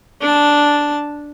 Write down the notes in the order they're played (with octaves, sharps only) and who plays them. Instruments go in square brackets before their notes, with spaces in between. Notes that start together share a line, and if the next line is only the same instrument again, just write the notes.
[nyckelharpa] D4 A5